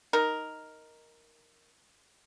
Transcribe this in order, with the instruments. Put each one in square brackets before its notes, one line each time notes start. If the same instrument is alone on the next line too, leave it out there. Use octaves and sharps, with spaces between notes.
[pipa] D#4 A#4